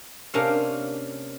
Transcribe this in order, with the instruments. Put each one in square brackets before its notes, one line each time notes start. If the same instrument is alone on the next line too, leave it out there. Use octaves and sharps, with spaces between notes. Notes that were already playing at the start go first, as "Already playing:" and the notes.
[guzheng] C3 A#3 C#4 D4 F5